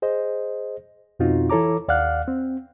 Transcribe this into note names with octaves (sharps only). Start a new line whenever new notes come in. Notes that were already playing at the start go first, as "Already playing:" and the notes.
G#4 C5 D#5
F2 B2 C4 D#4 F4 F#4
E3 E4 A4 C#5 A#5 D6
D#2 D5 F5 F#5 F6 F#6
C4